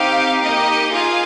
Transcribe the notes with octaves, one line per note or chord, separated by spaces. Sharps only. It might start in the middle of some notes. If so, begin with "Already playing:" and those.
Already playing: C4 D#4 G4 F5
A#3 D#4 G4 D#5
F4 G#4 F5